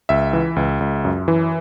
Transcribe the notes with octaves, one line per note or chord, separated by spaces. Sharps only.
C#2 E5
E3
C#2
C#2
F#2
E3